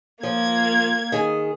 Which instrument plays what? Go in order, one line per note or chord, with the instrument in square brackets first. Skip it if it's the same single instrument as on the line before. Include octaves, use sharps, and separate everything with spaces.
[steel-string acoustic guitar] F3 [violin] A#3 G#6
[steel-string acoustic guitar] D#3 G#4